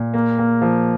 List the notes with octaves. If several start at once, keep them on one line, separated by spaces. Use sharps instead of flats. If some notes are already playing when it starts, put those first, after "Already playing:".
Already playing: A#2
A#3
A#3
F3